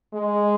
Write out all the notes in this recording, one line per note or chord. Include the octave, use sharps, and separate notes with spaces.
G#3